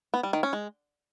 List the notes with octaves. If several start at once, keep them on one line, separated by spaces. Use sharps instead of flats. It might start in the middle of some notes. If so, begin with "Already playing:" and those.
B3
G3
D#3
C#4
G#3